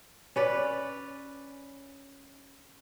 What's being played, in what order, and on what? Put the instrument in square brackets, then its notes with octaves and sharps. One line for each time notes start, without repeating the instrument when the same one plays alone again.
[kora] C#4 B4 D5